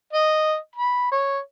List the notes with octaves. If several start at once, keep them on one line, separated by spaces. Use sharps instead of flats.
D#5
B5
C#5